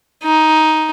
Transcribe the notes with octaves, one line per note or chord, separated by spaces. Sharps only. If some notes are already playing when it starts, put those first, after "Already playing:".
D#4